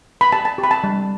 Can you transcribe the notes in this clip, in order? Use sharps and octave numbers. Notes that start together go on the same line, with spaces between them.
B5
G4 A5
A5
G4
B5
A5
G3